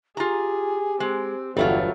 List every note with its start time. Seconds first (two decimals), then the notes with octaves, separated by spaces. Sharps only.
0.17 F4 G4 G#4 A#5
1.00 G#3 C4
1.57 G1 E2 F#3 G3 A3 F4 C#5